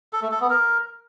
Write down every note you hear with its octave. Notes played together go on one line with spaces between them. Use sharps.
A4
A3
A4
B3
A#4